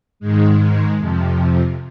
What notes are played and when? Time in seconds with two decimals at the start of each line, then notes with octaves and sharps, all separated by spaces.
0.20 G#2 D#3 G#3
0.58 G#3
0.98 F2 C3 F3